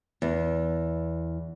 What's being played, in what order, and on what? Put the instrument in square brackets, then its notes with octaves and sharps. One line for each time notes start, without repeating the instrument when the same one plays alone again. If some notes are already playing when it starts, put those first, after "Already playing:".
[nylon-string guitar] E2